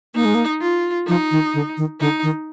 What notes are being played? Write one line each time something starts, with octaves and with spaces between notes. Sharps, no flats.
A#3 D#4
G#3
A#3
F4
F3 D#4
D#3
D3
D#3
D3 D#4
D#3